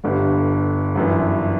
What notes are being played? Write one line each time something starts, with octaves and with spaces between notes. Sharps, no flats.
G1 G2 D3
G1 F#2 E3